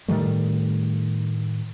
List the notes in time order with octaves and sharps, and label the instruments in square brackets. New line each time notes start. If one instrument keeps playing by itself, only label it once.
[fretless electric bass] A2 D#3 G3 A3